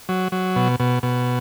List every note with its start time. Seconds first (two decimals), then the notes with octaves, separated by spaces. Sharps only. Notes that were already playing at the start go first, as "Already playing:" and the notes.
0.09 F#3
0.32 F#3
0.56 B2
0.80 B2
1.03 B2